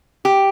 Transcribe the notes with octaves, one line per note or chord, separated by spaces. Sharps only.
G4